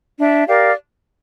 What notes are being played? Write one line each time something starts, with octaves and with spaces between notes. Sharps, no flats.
D4 E5
G4 A#4 D5 F5